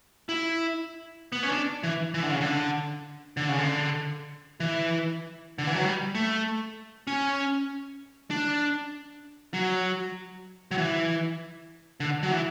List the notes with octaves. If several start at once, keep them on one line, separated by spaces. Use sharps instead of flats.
E4
B3
C#4
D4
E3
E3
D3
C#3
D3
D3
C#3
D3
E3
D3
E3
F#3
G3
A3
C#4
D4
F#3
F#3
E3
D3
F#3
E3